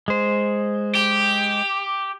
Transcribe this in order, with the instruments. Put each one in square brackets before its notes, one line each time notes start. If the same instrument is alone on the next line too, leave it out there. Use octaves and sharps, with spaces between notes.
[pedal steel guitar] G#3 C5
[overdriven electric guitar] G4